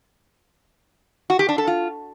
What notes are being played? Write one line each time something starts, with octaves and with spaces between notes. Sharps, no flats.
F#4
G4
D4
A4
F4